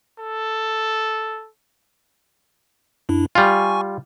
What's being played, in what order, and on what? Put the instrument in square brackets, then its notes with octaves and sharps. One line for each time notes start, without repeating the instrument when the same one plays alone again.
[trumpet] A4
[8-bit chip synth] F#2 D4 E4
[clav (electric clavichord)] G3 F4 [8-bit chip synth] G#5 C#6